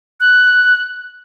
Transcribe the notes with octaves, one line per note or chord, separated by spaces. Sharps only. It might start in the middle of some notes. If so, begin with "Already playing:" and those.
F#6